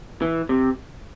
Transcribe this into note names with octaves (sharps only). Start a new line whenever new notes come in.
E3
C3